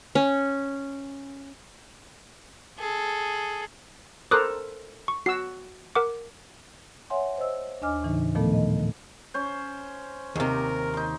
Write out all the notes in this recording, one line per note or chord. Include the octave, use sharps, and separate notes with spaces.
C#4
G#4 A4
A4 A#4 C5 D6 D#6 F#6
C#6
F#4 E6 C7
A#4 F#5 D6
C#5 E5 F#5 G#5 C6
C5 D#5 E6
D#2 D4 D#5 G#5 D6 F6
A2 C#3 E3 D#4
A#2 D#3 F3 A3 B3 A4
D#5
C#4 C5
D#2 C3 A#4
D#4 C6